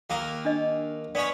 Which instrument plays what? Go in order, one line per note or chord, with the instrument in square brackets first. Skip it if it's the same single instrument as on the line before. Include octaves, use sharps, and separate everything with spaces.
[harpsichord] D#2 A#3 A#4
[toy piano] D4 D#5
[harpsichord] B3 C#4 C#5 [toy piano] D5